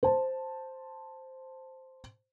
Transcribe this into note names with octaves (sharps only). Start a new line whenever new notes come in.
C5 A5